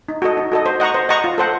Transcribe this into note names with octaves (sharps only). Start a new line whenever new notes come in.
D#4
F#4 A4 D#5
D#4
F#4 A4 D#5
C5
D#5 F#5 A#5 C#6
C5
D#5 F#5 A#5 C#6
F4
A4 C5 F#5